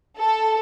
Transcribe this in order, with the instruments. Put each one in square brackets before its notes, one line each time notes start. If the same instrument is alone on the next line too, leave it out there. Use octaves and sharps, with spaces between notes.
[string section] A4